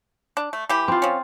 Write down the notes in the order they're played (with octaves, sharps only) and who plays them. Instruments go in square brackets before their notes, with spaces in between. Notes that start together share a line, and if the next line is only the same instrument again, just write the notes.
[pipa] D4
A3
E3 G4
[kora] C4 F4
[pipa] F3 C#4